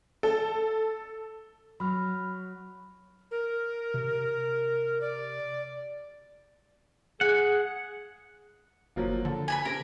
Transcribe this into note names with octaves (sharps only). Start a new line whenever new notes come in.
A4
F#3 B5 F6
A#4
C3
D5
G#4 F#5
G1 F3 F#3 A#3
D3 A4
G#5 A5 B5
C3 A#4